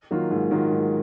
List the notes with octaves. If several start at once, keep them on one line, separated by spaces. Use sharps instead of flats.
D#3 F#3 A#3 F4
G#2
D#3 F#3 A#3 F4
G#2